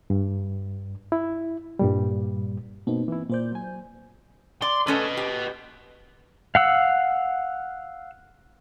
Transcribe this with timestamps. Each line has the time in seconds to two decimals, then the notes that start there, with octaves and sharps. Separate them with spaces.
0.10 G2
1.12 E4
1.79 G2 A#2 G3
2.87 B2 A#3 C4 D#4
3.08 E3 E4
3.29 A#2 A#3 C5 D5 G6
3.52 F#3 G#5
4.62 D5 C6
4.87 A3 C#4 A4 B4 D#5
5.17 G4
6.55 F5 F#5 E6